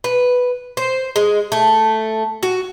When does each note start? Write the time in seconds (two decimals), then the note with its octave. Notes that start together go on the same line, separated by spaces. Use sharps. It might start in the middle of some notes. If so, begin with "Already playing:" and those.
0.04 B4
0.77 C5
1.16 G#3
1.52 A3
2.43 F#4